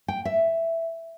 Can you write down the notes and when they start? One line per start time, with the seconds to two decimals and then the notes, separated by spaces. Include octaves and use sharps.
0.08 G5
0.25 E5